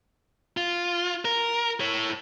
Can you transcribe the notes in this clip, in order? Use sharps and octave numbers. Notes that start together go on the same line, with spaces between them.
F4
A#4
E4 C#5